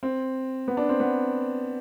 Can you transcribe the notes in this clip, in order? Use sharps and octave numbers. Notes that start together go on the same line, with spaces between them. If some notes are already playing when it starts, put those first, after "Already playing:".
C4
B3
D4
C4
B3